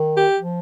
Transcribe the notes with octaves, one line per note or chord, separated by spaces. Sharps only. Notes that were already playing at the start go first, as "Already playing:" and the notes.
Already playing: D#3
G4
F3